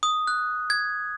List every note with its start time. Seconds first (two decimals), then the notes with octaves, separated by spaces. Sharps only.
0.03 D#6
0.27 F#6
0.70 G#6